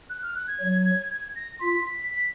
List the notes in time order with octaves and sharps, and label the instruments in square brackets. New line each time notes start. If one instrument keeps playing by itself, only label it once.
[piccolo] F#6
F6
F#6
G#6
[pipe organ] F#3 [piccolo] G#6
[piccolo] G#6
G#6
A#6
[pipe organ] F4 [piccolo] B6
[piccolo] B6
B6